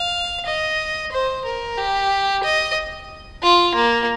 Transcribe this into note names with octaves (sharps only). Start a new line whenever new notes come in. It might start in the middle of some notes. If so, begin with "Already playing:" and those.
Already playing: F5
D#5
C5
A#4
G4
D#5
F4
A#3